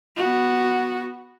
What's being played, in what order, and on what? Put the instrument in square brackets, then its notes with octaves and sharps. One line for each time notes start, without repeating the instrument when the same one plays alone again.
[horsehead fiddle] B3 F#4